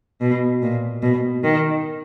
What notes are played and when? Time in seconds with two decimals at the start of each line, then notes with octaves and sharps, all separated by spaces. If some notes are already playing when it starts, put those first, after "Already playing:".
0.21 B2
0.62 A#2
1.03 B2
1.44 D#3